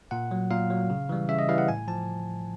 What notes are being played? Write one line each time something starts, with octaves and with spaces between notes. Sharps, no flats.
A#2 F#5
F#3
A#2 F5
F#3
C#3
E3 G3
C#3 E5
D#5
E3 G3 F5
F#5
A2 G#5
F3 A5